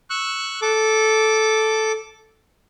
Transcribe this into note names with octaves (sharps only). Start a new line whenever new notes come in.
C#6 E6 F#6
A4 D6